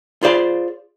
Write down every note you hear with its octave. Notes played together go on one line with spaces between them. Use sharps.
F4 G#4 C5 D5 F5 B5